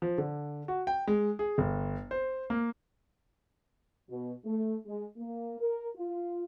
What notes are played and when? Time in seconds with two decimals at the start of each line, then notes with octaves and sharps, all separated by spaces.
0.02 F3
0.18 D3
0.68 F#4
0.87 G5
1.07 G#3
1.39 G#4
1.58 G1
2.11 C5
2.50 A#3
4.10 B2
4.45 A3
4.86 G#3
5.17 A#3
5.59 A#4
5.96 F4